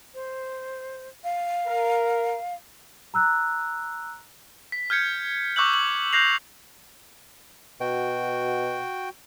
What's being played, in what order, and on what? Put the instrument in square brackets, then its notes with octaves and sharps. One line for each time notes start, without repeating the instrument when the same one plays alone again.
[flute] C5
F5
[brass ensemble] A#4
[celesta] A#5 E6 F#6
[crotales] B6
F6 G6 G#6 C#7
C#6 D6 E6 F#6 G6 F#7
F#7
F#6 G6 A#6 C7 F7
[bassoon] B2 [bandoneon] F#4 G5